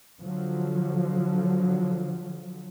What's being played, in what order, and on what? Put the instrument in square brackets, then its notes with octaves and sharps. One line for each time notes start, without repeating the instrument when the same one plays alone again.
[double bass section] D3 F3 F#3